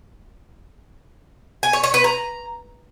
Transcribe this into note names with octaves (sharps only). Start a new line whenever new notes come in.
G#5
C#5
C#5
B4
A#5